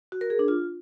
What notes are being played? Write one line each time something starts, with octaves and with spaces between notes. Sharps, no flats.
F#4
A#4
G#4
D4
F4